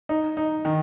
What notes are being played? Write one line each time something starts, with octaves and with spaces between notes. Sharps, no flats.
D#4
D#4
D#3